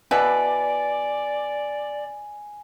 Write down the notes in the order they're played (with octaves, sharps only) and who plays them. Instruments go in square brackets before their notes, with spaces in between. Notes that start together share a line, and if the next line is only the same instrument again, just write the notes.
[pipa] B2 E4 B4 [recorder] D5 [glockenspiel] G#5